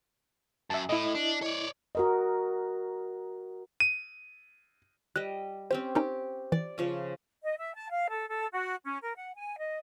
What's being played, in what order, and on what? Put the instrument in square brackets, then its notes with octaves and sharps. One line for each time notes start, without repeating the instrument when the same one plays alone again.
[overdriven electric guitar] F#2 [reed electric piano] E5 A5
[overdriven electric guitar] A2 [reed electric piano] E4 D#5
[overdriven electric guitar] D4
C#5 D5
[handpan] F#4 A#4 D#5
[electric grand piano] D#7
[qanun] G3 D#5 [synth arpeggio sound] F#6
[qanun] C4 C#4 G4 [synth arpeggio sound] C5
[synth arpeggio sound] C#4 D#4 A#4 [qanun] G4
[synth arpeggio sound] E3 [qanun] D5
[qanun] C#3 F3 C#4
[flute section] D#5
E5
A5
F5
A4
A4
F#4
C#4
A#4
F#5
G#5
D#5